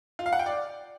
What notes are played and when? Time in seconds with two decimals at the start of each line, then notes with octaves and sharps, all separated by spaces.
0.19 F4
0.26 F5
0.33 F#5
0.39 G5
0.46 D5